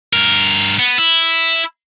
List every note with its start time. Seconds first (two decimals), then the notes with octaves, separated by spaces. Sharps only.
0.13 G2 A#4
0.79 B3
0.98 E4